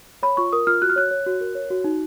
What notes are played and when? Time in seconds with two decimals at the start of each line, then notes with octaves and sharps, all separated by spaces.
0.23 C#5 B5
0.37 F4 C#6
0.53 A#4 D#6
0.67 F4 F6
0.82 F#4 F#6
0.89 F6
0.96 C#5 F#6
1.11 C#5
1.26 F#4
1.41 A#4
1.55 C#5
1.70 F#4
1.84 D#4